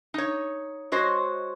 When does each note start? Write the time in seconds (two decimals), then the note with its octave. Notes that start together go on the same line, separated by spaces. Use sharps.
0.14 D#4 C#5
0.92 G#3 F#4 C5 C#5 D#5